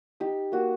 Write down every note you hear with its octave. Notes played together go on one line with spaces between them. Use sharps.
D#4 G4
A#3 F#4